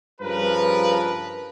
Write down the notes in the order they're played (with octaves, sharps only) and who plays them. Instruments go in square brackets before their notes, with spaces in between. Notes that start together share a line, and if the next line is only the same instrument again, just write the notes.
[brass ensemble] G2 C#3 F3 A#4 B4